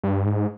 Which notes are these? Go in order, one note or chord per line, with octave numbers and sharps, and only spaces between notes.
G2
G#2